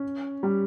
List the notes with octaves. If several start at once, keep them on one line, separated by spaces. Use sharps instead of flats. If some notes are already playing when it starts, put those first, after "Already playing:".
Already playing: C#4
G3